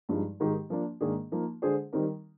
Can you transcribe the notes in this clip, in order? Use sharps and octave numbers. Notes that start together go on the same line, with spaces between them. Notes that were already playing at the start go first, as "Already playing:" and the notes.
G2 F3 G#3 D#4
G#2 D#3 G#3 D#4 G4
F3 A#3 D4
G#2 D#3 A#3 D4 G#4
F3 A#3 D#4
D3 G#3 D4 G#4 C5
D#3 G3 C4 D#4 A#4